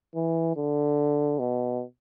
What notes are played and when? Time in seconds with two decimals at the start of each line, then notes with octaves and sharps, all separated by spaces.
0.15 E3
0.56 D3
1.39 B2